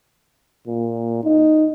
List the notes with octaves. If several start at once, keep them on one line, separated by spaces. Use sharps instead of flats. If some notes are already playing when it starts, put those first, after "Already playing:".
A#2
D#4